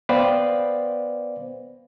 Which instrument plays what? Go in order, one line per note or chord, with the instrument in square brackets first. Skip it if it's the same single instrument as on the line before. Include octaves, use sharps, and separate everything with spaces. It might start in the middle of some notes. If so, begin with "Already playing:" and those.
[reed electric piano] B3 B4 C5 D5 F5 G5